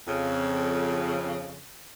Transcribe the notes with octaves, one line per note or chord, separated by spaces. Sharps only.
F2 C#3